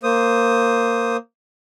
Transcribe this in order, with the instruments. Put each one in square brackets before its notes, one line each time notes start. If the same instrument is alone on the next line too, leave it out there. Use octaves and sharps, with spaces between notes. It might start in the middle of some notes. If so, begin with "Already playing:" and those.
[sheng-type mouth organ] A#3 C5 D#6